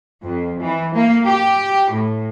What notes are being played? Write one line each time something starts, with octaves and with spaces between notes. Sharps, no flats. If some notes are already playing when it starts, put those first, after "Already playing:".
F2
E3
A#3
G4
A2